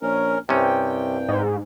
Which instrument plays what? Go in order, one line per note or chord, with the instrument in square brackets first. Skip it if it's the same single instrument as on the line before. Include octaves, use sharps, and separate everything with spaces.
[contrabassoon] A#1 [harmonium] C#4 A#4
[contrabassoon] C2 [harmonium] G2 G5 [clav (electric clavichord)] C3 C#4
[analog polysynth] G#2